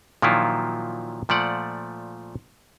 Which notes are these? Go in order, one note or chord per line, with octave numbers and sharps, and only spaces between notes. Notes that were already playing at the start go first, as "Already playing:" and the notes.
A#2 D#3 F3 F#3 E4 F4
A#2 F3 A3 D5 F#5